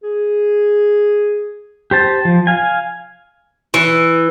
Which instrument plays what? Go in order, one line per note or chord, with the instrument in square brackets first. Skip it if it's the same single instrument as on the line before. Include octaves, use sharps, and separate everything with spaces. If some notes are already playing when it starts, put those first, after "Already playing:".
[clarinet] G#4
[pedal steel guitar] G4 C5 A5
F3
F5 G#5
[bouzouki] E3